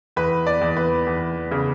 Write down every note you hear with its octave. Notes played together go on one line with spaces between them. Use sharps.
E2 B4
D5
E2
B4
E2
C#3